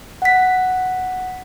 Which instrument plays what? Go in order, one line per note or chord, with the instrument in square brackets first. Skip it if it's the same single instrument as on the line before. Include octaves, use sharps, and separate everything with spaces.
[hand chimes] F#5 B6